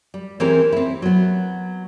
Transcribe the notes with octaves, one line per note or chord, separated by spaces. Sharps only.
G3
E3 G#3 C4 C#4 G4 A#4
C4 E4
F#3 B3